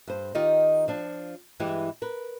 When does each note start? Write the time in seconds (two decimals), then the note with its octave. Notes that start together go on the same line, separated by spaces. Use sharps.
0.08 G2 C5
0.35 D#3 D#4 F4 G4 D#5
0.88 F3 D4
1.60 G2 E3 G#3 E4 G4
2.02 A#4 B4